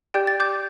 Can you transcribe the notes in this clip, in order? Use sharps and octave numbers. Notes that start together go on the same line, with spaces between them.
G4 D5 G5 G6
A6
D6 G6